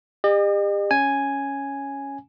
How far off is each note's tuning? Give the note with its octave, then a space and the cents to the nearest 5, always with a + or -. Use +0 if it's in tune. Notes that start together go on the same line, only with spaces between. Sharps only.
G4 +40 D#5 -40
C#4 +0 G#5 +0